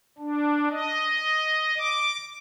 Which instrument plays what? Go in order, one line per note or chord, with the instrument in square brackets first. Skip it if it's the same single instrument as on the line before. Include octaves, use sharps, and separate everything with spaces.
[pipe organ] D4
D#5
D6